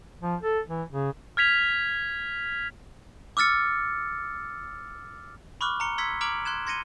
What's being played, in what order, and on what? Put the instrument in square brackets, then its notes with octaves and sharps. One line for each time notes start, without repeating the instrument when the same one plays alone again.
[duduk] F3
A4
E3
C#3
[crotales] F6 G#6 B6 F7
[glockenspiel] D6 E6 F6 A6 C#7
B5 C#6 D6 F6 F#6
A#5 C#7 G7
C6 E6 G#6 B6 C#7
A#5 D6 F6 G#6 D7 F#7
C6 F#6 G#6 E7
C6 G#6 A#6 C#7 D#7 G7